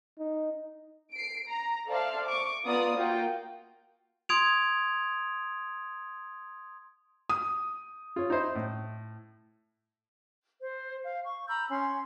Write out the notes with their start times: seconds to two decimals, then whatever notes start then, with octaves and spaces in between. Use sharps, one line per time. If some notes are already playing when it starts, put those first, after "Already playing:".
0.19 D#4
1.12 C7 D7
1.47 A#5
1.87 A4 C5 D5 E5 F5 A5
2.25 C#6 D6
2.65 B3 F4 D5 A#5 D#6
2.97 A#3 F4 F#4 G5
4.29 C6 D#6 G#6 D7 F7
7.29 D#6
8.16 F4 C#5
8.30 D#4 E4 C5
8.55 A2
10.59 C5
11.03 F5
11.23 C#6
11.48 A#5 B5 E6 G6
11.70 C#4 C6